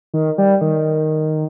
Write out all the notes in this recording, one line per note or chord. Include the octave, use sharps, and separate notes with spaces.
D#3
G3
D#3